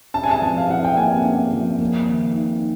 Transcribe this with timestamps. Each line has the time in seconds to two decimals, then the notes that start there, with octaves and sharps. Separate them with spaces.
0.14 C#4 A5
0.23 G#5
0.31 A5
0.42 F3
0.57 F5
0.70 E4 F#5
0.85 G5
0.97 A#3 G#5
1.25 C#4
1.53 F3
1.81 A#3
2.08 D#3
2.36 D#4